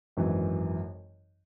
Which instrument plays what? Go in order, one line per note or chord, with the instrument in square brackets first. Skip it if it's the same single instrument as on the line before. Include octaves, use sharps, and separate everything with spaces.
[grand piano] G#1 F#2 E3 G#3